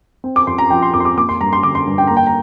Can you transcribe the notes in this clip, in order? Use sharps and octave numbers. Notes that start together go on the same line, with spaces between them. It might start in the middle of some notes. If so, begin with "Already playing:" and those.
C4
D6
F2 C6
A#5
F3 G5
C6
F2 D6
C6
D6
A#3 D6
C6
G2 A#5
C6
D3 D6
C6
G2
G5
A#3 A#5
G5
A#5